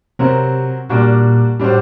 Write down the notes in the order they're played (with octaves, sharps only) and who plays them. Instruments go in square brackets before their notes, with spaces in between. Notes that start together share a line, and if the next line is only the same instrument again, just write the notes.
[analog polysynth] C3 [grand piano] F#3 C4 F#4 A#4
[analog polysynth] A#2 [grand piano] G3 A#3 D4 F#4
[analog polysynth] A2 [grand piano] G3 D4 F#4 C5